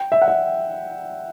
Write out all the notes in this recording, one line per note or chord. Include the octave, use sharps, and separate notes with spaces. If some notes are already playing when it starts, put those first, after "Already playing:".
Already playing: G5
E5
F#5
E5